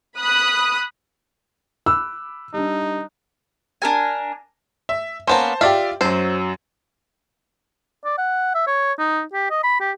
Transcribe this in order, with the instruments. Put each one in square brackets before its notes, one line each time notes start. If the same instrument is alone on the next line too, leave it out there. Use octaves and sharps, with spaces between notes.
[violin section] B5 D#6 F#6
[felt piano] B5 D6 F#6 [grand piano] E6
[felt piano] G3 D4 [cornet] D#4
[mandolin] D4 A#4 G#5
[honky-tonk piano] E5
[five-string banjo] A#3 B3 C#4 [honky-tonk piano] C5 A5
[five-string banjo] F4 [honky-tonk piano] G4 D5 E5
[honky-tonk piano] F#2 F#3 [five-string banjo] C5
[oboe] D5
F#5
E5
C#5
D#4
G4
D#5
B5
G4